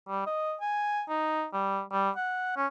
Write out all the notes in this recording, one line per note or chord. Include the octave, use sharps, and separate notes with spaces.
G3
D#5
G#5
D#4
G3
G3
F#5
C#4